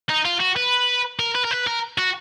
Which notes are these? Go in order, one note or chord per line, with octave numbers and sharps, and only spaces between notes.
D#4
F4
F#4
B4
A#4
B4
A#4
B4
A#4
F#4